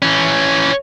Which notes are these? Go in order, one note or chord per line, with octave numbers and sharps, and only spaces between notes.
E3 C#4